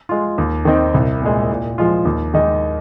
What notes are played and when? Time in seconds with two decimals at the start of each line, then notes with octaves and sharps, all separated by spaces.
0.09 G#3 F4
0.38 D#2
0.65 D#3 C4 D#4
0.94 C2
1.22 A#2 G#3
1.50 A#2
1.78 F3 G#3 F4
2.05 D#2
2.34 D#3 G#3 D#4